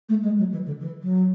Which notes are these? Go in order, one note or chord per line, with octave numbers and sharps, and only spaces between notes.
A3
G#3
F#3
E3
D3
E3
F#3